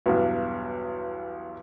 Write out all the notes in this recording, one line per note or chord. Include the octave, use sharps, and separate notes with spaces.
B1 E2 G2